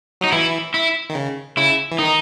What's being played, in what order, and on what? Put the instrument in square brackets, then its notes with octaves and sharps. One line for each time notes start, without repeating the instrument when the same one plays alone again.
[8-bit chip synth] F#3 [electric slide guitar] D#4
[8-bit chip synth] E3 [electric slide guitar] E4
[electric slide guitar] E4
[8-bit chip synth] D#3
C#3
[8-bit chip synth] C#3 [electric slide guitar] E4
[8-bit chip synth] E3
[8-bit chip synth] D#3 [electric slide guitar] D#4